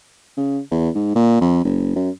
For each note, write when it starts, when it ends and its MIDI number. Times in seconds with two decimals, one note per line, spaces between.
0.38 0.59 49
0.71 0.90 40
0.95 1.13 44
1.15 1.40 46
1.41 1.64 41
1.65 1.93 30
1.96 2.10 42